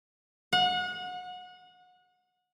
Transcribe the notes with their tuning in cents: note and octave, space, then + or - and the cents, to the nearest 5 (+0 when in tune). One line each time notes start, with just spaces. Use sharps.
F#5 -30